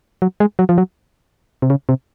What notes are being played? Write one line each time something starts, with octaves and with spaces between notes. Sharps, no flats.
F#3
G#3
F#3
F3
F#3
C3
C#3
C3